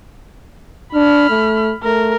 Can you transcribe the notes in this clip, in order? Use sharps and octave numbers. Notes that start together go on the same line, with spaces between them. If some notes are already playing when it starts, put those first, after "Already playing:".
D4 B5 F6
A3
A3 A#4